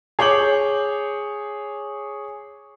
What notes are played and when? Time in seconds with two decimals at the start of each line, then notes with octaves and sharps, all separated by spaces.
0.19 G#4 C#5 D6 G6 F#7